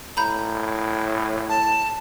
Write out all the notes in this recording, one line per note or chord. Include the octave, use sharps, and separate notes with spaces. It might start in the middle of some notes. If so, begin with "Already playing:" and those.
A2 A#5 B5 G6
A5